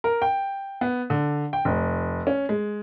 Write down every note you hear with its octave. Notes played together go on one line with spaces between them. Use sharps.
A#4
G5
B3
D3
G5
F1
C#4
G#3